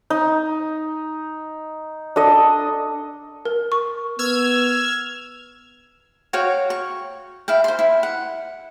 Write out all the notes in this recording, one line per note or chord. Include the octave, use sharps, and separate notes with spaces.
D#4
D4 A4 D#5
A#4
C#6
B3 E6 F6 G#6
F#4 C#5 F5 G5
C#6
E4 F5 G5
C5 C6
E4
F#5